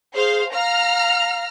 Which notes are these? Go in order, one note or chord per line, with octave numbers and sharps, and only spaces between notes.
G#4 C5 F5
F5 A#5 F6